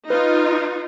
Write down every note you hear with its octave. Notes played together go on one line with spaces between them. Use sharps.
D#4 F4 B4